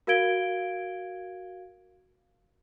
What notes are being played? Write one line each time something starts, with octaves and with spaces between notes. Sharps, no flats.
F#4 A#4 F5 G#6 D7 G7